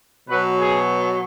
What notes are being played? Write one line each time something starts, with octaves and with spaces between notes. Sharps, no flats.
B2 F#3 B4
G#4